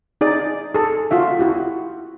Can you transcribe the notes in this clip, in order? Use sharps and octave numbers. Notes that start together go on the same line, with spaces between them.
D#4 G#4 D5
G#4 A4
F4 F#4 E5
E4 F#4 G4